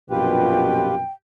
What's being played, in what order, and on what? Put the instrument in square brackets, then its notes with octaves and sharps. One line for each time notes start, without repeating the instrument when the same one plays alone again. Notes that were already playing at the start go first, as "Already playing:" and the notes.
[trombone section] A#1 F#2 B2 [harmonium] F4 G4 B4 [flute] G5